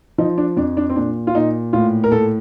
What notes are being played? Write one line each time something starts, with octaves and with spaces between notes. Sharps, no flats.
F3 D#4
D4
F2 D4
D4
C4
A#2 D4
F4
A#2 D#4
A2 F4
A#4
A2 A4